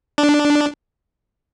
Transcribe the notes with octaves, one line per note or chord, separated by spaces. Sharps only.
D4